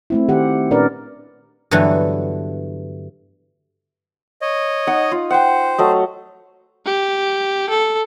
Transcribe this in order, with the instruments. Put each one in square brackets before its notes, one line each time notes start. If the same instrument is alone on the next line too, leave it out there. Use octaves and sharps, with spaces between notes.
[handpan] A3 C4 E4
D#3 G4 C5 F#5
A#2 C#4 D4 A#4 B4 D5
[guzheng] G2 D3 E3 F#3 A3 B3
[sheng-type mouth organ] C#5 D#5
[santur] D#4 F#5
F4
[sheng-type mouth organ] C5 [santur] F#5 G5
[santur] F#3 A3 D#5
[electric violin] G4
A4